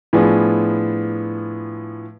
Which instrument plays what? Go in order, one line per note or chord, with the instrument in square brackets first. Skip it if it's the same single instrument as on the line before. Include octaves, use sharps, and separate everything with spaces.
[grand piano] A2 F3 B3 D4 F4 G#4